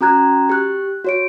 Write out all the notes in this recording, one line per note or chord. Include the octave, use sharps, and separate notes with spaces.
C#4 F#4 A#5 F#6 G#6
G4 F#6
F#4 C#5 D7